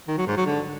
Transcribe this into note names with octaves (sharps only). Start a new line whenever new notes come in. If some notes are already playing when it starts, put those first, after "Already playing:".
D#3
F#3
G#2
F#3
D3